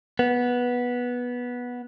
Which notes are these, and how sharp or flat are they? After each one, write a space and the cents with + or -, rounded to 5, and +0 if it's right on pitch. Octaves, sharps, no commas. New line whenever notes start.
B3 -10